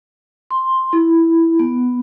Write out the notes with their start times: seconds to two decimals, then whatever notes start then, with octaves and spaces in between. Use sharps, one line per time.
0.51 C6
0.93 E4
1.59 B3